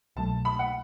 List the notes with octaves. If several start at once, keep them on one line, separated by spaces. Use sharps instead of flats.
C2 B2 F#3 A3 A5
B5
F#5